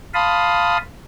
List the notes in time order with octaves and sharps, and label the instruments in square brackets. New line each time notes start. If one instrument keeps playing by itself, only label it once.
[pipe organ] F5 A5 B5 C6 D#6